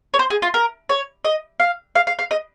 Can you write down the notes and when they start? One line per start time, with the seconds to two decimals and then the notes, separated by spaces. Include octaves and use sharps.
0.14 C#5
0.19 C5
0.30 G#4
0.42 F4
0.54 A#4
0.89 C#5
1.25 D#5
1.60 F5
1.95 F5
2.07 F5
2.19 F5
2.31 D#5